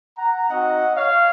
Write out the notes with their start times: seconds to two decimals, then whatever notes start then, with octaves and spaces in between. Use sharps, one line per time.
0.17 F#5 A#5
0.48 C4 D#4 F#4 D#5 F#5
0.95 C#5 F5